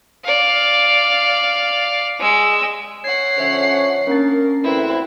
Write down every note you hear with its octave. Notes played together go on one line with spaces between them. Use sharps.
D5 F5
G#3 E6
C#5 F#5 G#6 C7
D3 F3 C#4 C5 E5 G#6
A#3 C#4 D4 A#4 A6
A1 D2 C4 E4 B4